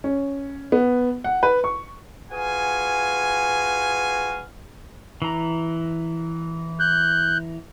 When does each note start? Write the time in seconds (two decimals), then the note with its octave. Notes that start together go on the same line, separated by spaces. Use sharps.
0.04 C#4
0.72 B3
1.24 F#5
1.43 B4
1.64 C#6
2.31 F4 F#4 G#4 B4 F5 G#5
5.22 E3 A#5
6.80 F#6 G6